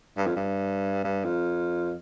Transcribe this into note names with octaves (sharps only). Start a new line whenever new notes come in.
G2
F2
G2
G2
F2